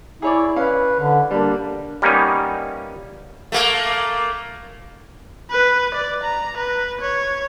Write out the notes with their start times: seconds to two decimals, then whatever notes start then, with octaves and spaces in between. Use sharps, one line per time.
0.22 E4 G#4 C#5 D5
0.56 C#4 B4 F5
1.00 D3
1.31 G3 A#3 D4
2.02 G3 A#3 B3 C#4 D#4
3.52 A3 A#3
5.51 B4
5.94 D5
6.23 A#5
6.57 B4
7.01 C#5